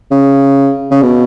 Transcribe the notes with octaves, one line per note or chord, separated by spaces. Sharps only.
C#3
C#3
B2